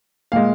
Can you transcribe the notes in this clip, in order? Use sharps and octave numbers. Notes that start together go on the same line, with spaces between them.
A#2 G#3 F5